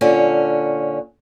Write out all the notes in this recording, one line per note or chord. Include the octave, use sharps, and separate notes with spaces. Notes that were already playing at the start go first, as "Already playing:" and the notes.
A#2 D3 C#4